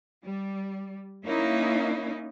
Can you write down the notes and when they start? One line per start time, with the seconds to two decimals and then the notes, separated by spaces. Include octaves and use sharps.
0.24 G3
1.24 A#3 C#4 D#4 E4